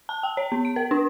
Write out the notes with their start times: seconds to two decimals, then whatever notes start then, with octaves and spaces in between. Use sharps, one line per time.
0.09 A5
0.23 G5
0.37 C#5
0.52 B3
0.65 D7
0.76 A#4
0.91 D4